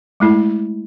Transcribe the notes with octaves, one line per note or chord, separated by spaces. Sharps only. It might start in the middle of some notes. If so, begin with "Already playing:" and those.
G#3 A3 E4